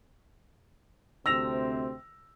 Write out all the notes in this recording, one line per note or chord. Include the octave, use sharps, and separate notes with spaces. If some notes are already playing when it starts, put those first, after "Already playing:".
D2 C3 C4 E6 A#6 F7